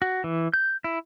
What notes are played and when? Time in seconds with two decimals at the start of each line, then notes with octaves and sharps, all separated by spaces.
0.02 F#4
0.24 E3
0.54 G6
0.84 E4